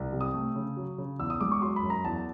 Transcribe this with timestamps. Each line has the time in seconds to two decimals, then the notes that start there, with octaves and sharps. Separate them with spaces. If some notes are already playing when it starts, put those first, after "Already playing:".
Already playing: C2
0.13 C3
0.21 D#6
0.34 A3
0.55 C#3
0.77 F#3
0.98 C#3
1.19 E2 E6
1.30 D#6
1.41 G#3 D6
1.52 C#6
1.61 F#3 C6
1.76 B5
1.83 F#2
1.90 A#5
2.05 E2 A5